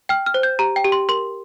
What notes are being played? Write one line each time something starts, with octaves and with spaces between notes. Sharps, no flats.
G5 F6
F6
C5
G6
G4 A#5
G5
G4
C6
A#4 C6